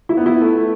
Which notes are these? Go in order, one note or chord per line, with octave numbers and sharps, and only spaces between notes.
E4
B3
E4
A3